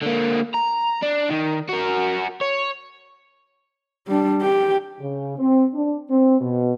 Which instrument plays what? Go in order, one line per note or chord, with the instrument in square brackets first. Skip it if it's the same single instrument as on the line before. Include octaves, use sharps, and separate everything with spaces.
[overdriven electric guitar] D3 A#3
A#5
D4
D#3
F#4 A#4
C#5
[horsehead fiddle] G3 D4
G4 G5
[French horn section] C#3
C4
D4
C4
B2